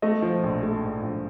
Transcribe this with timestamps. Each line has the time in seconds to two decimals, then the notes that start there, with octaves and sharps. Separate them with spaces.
0.02 A3 D#5
0.22 F3
0.44 A#1
0.63 A3
0.83 G#2
1.03 A#1